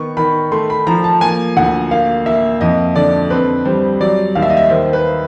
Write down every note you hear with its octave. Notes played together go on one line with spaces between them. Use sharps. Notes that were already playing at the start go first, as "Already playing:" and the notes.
Already playing: D#3 B3 C#6
D#3 B5
A3 C6
B5
F3 A#5
A5
A#3 G#5
D2 F#5
A#3 F5
A#3 E5
F2 D#5
D3 D5
C4 B4
G3 C5
F#3 D5
D#2 F5
E5
D#5
E5
D#3 C5
B4